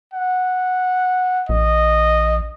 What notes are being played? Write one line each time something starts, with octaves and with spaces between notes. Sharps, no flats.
F#5
A#1 D#5